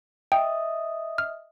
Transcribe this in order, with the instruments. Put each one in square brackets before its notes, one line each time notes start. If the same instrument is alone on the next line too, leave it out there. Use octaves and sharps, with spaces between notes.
[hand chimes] D#5 E5 D#6 [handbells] G5
[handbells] F6